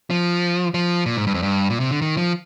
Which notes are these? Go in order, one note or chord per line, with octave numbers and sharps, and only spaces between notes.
F3
F3
A#2
G#2
G2
F2
G2
A#2
C3
D3
D#3
F3